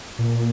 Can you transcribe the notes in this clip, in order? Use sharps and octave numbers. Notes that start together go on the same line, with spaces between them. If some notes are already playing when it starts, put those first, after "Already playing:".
A#2